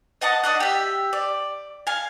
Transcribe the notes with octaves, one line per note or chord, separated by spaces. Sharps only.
D#5 F#5 A5 D#6
D4 D#5 F#5
G4 E5
D5
F5 G#5